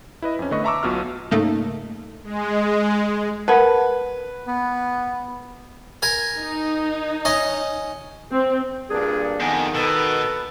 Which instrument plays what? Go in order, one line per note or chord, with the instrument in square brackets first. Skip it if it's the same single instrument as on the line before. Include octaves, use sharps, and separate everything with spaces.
[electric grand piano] E4 B4 D#5
F2 C#4
D3 A3 B3 B4 D#5 C#6
E5 A5 A#5 C#6 D6 E6
B1 B2 F4 F6
[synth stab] G#2 C#3 A3 A#3 D#4
[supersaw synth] G#3
[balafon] A#4 F#5 A5 [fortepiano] B4
[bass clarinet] B3
[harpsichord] A#4 G#5
[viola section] D#4
[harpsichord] C#4 D#5
[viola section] C4
[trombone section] G2 A#2 D4 [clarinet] G#4 [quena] A#4
[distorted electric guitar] F2 [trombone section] D#3 [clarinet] B3 [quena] G#5
[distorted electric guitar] B2 [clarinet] A4 [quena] B4